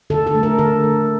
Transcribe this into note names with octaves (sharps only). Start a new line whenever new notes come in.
D3 A4
A4
A3
A#4
D3 A4
A3